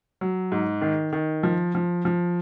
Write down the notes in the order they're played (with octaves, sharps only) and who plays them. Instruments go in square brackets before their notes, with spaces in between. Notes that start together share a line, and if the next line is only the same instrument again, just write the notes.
[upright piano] F#3
G#2
D#3
D#3
F3
F3
F3